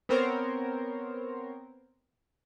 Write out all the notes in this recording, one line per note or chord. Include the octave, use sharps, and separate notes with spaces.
B3 C4 A#4 C5 C#5